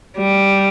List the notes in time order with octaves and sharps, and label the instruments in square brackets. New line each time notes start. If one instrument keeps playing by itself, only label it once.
[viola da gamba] G3